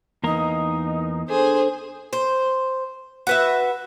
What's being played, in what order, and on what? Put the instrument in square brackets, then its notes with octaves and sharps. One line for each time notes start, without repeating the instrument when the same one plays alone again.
[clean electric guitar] E2 A#3 A#4 [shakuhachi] D#4 [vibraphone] B4 D#6
[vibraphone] D4 A4 [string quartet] G#4 C5
[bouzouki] C5
F#4 B4 E5